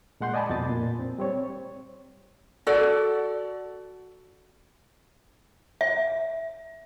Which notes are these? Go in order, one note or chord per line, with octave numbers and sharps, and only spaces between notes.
A#2 G#3 F#5 C6 G6
D5 D#5 G#5 A5 B5
F2 B2 A6
A#2
C4
G3 C4 C#5
F#4 A4 D5
E5